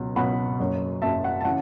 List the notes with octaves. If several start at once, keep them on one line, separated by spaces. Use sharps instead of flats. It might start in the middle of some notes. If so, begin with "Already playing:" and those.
Already playing: C#2 B2 F#3
C#2 B2 F#3 F#5 B5
F#1 F#2 F#3
F#1 F#2 F#3 E5 A5
F#5
A5
C#3 E3 F#5